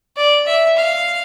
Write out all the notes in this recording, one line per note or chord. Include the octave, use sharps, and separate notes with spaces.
D5
E5
F5